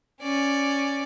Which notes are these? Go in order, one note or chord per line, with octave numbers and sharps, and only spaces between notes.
C#4 D5